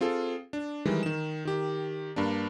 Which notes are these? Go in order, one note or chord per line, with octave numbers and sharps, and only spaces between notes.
C4 F4 G#4 A4
D4
D#3 E3 G3 G#3
D#3 E7
D#3 G4
G2 A#3 D4